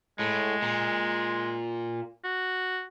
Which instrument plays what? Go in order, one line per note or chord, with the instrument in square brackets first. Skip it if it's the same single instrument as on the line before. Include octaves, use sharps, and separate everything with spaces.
[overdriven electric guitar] A2 [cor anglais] G#3
[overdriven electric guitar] A#2
[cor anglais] F#4